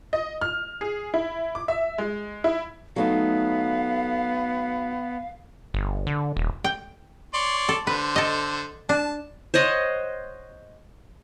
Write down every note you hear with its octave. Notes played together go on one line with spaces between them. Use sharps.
D#5
F6
G#4
E4
D6
E5
G#3
E4
F#3 A3 B3 D#4 F5
G1
D3
D#1
G5
C#5 D5 C6
A4
D3 B4 C5
A4 D#5
D4 A5
C5 C#5 D#5 F#5